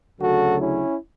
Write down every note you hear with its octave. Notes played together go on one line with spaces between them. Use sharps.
D2 C#3 F#3 F#4 A4
C#4 E4